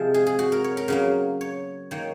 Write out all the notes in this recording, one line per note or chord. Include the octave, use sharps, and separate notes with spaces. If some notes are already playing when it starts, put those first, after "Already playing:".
Already playing: C3 F3 G#3
G#4
G#4
F#4
A#4
C#5
A#4
C#3 F#3 A#3
C#5
D#3 A#3 C#5